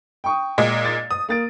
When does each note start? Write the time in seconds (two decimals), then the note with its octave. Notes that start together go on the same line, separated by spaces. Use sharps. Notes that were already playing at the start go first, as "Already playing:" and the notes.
0.24 G5 C#6 D#6
0.58 A#2 G#3 D#5
0.85 A6
1.11 D#6
1.29 A#3 A6 D7